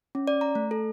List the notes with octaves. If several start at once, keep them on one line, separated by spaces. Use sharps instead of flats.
C#4
D5
A#5
A3
A4